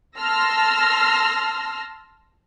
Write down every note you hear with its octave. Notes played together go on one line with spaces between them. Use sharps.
A5 C6 E6 F6 A#6